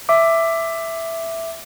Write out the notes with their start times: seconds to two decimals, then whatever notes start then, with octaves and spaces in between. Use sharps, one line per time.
0.09 E5 D6